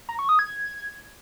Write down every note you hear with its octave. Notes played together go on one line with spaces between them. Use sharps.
A#5
C#6
D#6
G#6